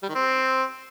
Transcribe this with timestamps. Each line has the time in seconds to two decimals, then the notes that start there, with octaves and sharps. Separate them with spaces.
0.03 G3
0.09 D#3
0.15 C4